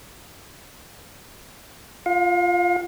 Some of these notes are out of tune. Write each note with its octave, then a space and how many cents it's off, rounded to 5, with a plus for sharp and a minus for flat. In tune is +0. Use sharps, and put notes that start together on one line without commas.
F4 -5 F5 +40